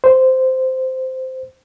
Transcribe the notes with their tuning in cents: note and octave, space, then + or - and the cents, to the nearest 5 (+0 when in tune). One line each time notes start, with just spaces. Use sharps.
C5 -10